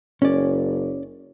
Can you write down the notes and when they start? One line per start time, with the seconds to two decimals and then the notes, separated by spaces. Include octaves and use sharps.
0.22 F#1 C#4 D5